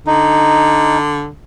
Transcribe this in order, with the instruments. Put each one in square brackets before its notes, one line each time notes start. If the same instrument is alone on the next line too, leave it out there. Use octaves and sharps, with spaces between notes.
[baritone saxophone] D3 [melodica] D#4